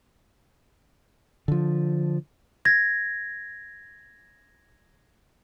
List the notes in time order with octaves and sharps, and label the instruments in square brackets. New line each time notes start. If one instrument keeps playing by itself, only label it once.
[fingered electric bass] D3 F3
[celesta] G#6 A#6